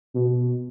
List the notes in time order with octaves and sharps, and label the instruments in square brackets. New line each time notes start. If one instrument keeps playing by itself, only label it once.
[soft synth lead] B2